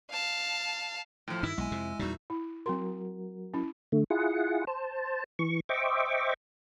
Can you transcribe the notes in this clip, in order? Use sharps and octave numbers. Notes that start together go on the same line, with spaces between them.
F5 A5
A2 F3
G2 D#3 E4
B1 G#3 G#5
F2 C3
E2 A#2 G3 D#4 F#4
E4
F#3 C4 F#4 A#4 C6
C#4 E4
D3 A3
E4 F4 G#4 F#5
C5 A5
E3 C#6
C5 D#5 E5 G5 C#6 D6